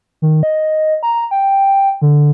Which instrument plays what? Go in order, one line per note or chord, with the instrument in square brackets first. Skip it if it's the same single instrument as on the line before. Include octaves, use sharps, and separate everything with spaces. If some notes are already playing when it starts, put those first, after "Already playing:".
[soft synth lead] D#3
D#5
A#5
G5
D3